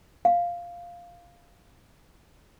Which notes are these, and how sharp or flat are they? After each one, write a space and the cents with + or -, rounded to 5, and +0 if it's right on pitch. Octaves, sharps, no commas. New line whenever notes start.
F5 +0